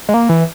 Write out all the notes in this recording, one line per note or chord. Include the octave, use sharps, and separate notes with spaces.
G#3
A#3
E3